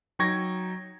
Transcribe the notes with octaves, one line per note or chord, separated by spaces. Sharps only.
F#3 D#4 G5 C#6 G#6 A#6